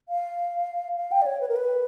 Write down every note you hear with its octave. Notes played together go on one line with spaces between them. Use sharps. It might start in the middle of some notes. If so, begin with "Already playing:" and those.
F5
F5
G5
D5
C#5
B4
A#4
B4